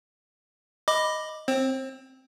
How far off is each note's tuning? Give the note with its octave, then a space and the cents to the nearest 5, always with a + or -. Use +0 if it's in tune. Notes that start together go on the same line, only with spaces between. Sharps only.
D#5 +0 B5 +0 D6 +10
C4 +0 C5 +35